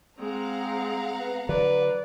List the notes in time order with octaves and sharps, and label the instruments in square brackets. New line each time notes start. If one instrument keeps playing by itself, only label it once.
[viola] G#3 C4 [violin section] F5 F#5 A#5
[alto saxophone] B3
[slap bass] D3 F#3 [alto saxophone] B4 [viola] D5